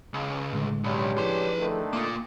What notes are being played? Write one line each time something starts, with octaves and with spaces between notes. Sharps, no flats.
C#2
A2 D3 G#3
B1 C#4 D4 G4
F3 E4 G#4 B4 C6
D3 D#3 A3
A#3 F4 D6 D#6